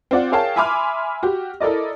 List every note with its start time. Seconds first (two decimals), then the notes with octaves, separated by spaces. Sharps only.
0.11 C4 F4 D5 F#5
0.32 G#4 A#4 C#5 F5 G5 A5
0.56 E5 G#5 B5 C6 D6 F6
1.23 F#4 G4
1.60 E4 A4 A#4 D5 D#5